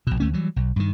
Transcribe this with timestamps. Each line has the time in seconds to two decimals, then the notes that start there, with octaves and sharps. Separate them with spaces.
0.07 A#1 B2
0.20 D2 A3 C#4
0.33 E3 F#3 G3
0.56 B1
0.76 G2 D#3